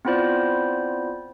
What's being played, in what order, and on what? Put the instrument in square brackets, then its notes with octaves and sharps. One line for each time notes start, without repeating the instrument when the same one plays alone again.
[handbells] B3 C4 E4 F4 C5 D5